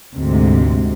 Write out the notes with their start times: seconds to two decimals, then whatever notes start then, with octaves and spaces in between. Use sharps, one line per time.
0.14 D2 G#2 C3